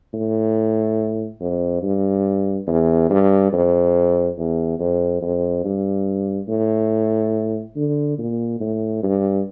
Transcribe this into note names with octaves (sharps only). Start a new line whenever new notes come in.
A2
F2
G2
E2
G2
F2
E2
F2
F2
G2
A2
D3
A#2
A2
G2